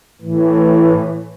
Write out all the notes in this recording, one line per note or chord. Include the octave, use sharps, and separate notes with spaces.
A2 E3